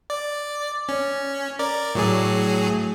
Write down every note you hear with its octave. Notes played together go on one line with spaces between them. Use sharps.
D5
C#4
A#4 D5
A2 F#3 G#4